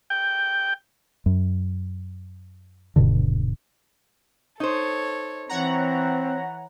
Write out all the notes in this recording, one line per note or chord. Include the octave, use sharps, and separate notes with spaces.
G5
F#2
D#1 G2 B2 D3
D#4 A4 C5 C#5
E3 C4 C#5 F#5 A#5